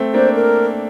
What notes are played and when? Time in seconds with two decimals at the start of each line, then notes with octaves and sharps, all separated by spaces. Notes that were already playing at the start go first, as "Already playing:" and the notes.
Already playing: A3 C4
0.14 A#3 D4 C5
0.35 A#4